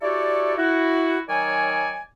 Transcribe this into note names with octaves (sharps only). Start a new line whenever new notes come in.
E4 F#4 G4 A4 C#5 D5
E4 F#4
D#3 F#3 C#5 D5 G#5